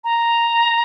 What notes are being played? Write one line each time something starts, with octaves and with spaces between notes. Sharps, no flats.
A#5